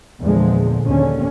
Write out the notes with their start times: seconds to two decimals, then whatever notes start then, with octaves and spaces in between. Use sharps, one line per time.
0.21 E2 A#2 D3 F3 G#3
0.86 D#2 D3 C#4